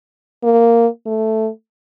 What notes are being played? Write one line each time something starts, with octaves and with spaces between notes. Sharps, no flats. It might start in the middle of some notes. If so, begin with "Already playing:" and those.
A#3
A3